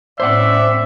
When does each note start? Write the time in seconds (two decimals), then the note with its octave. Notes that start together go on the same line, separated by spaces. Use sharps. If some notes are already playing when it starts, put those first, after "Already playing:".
0.20 A2 C4 C#4 C5 D5 E5 F#5